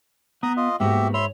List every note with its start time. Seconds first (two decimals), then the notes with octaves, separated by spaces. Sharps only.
0.43 B3 A#5 D#6
0.57 F4 D#5
0.80 G#2 A#3 B3 F#4 G4 E5
1.14 C#5 E5 B5 C6